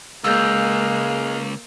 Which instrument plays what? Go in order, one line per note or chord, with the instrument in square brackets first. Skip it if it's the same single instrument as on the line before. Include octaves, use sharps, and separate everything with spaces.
[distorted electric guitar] C#2 [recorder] G#3 [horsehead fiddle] A#3 F5 [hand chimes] E6 G6